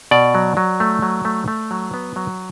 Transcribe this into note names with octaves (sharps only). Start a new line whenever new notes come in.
B2 D5
F#3
F#3
A3
F#3
A3
A3
F#3
B3
F#3